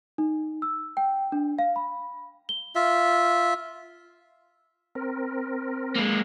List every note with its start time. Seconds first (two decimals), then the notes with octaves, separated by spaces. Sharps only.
0.18 D#4
0.62 E6
0.97 G5
1.32 D4
1.59 F5
1.76 B5
2.49 G7
2.75 F4 E5
4.95 C4 A#4
5.96 G#3 A#3